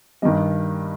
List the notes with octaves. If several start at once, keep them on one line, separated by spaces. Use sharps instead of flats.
G2 D#3 G3 D#5